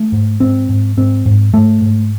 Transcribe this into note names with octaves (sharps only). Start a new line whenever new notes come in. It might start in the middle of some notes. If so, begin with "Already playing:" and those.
Already playing: A3
G#2
G#2 C4
G#2
G#2 C4
G#2
G#2 A3
G#2